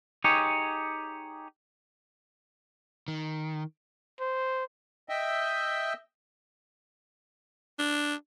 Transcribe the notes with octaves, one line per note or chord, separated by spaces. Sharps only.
D#4 G4 G#4 C#5
D#3
C5
D#5 E5 G5
D4